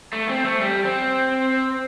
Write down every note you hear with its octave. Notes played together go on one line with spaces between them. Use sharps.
A3
C4
A3
G3
C4